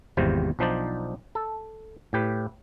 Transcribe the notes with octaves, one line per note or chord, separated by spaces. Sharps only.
G#1 E2 C3 G3 F4 C5
B1 F3 D4 D#4 C5 D5
A4
A2 G4 B4